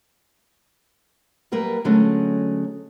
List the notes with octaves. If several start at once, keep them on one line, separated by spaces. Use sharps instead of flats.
F#3 G3 A#3 A#4 B4
D3 F#3 G#3 A3 C#4